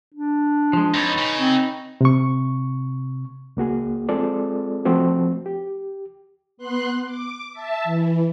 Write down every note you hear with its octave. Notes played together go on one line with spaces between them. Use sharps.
D4
F3 G#3
F2 D#4 B4 C#5
C#3
C4
C3 C#6
C#2 A#3 F#4 G#4
G#3 C4 F4 G#4 A4 D5
F3 A3 C4 F#4
G4
B3 C6 F#6
D6
E5 A5
E3